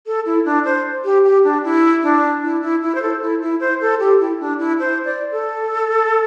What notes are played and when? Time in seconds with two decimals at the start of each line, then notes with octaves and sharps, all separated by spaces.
0.06 A4
0.26 E4
0.45 D4
0.65 C5
1.05 G4
1.24 G4
1.44 D4
1.64 E4
2.03 D4
2.43 E4
2.62 E4
2.82 E4
2.95 C5
3.02 A4
3.21 E4
3.42 E4
3.60 C5
3.81 A4
4.00 G4
4.20 E4
4.40 D4
4.59 E4
4.80 C5
5.05 D5
5.31 A4